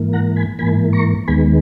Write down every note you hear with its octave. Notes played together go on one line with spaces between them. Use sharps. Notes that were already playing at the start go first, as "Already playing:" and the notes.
Already playing: G#2 E3 A#3
F#5 A#5
G#5 B5
G#2 E3 A#3 G#5 B5
A#5 C#6
D#2 D#3 G#3 B3 G#5 B5